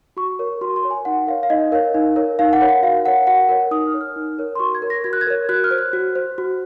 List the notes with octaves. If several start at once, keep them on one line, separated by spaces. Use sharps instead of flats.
F#4 C#6
A#4 C#5
F#4 C6
C6
A#4 C#5
G#5
D#4 F#5
A#4 C#5 F5
F5
D#4 D#5
A#4 C#5 F5
D#4
A#4 C#5
D#4 F5
F#5
A#4 C#5
F#5
F#4 F5
A#4 C#5 F#5
F#4 F#5
A#4 C#5
D#4 D#6
F6
A#4 C#5
F6
D#4
A#4 C#5
C6
F#4 C#6
G#6
A#4 C#5
A#6
F#4 G#6
F#6
G#6
A#4 C#5
F#4 F#6
F6
C5
F#6
F#4
C5
F#4